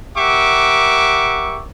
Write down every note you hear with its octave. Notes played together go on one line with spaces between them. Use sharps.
G4 A#4 E5 F#5 C#6 D6